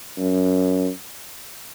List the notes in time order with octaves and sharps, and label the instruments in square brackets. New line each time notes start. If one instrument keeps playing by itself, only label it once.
[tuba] F#2